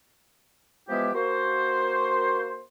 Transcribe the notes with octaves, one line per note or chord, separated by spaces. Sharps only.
E3 F3 G#3 B3 E4 G4
A#3 F#4 C5